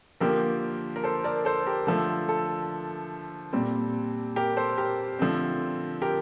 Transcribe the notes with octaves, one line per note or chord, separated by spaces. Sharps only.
D3 F3 A#3 G4 A#4
A#4
A4 C5
A#4 D5
A4 C5
G4 A#4
D3 F3 A3 A4
A4
A#2 G3 C4
G4 A#4
A4 C5
G4 A#4
D3 F3 A3 C4
G4 A#4